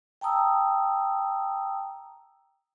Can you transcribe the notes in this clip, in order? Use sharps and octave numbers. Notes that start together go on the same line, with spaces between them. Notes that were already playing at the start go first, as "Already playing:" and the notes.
G5 A5 A#5 D#6 E6